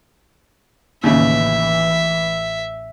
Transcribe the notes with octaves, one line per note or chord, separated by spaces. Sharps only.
A1 D#2 C#3 E3 E5